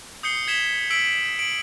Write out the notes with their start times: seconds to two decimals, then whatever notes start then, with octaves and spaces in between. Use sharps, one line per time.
0.23 D#6 G6 C7 C#7 G7
0.48 G#6 B6 E7 G7
0.90 E6 B6 D7 F#7
1.39 D7 F#7